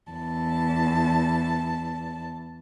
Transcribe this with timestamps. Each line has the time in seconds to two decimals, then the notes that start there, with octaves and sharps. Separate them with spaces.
0.12 E2 A5